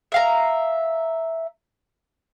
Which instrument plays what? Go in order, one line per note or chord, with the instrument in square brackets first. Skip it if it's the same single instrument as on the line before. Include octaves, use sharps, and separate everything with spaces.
[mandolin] E5 F5 A#5